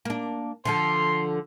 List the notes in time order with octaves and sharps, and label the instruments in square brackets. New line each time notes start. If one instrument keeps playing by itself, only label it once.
[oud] A#3 D4
[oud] D3 F3 A4 [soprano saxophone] C6